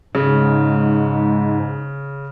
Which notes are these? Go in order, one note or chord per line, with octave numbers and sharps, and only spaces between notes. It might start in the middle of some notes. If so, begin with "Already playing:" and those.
G#2 C#3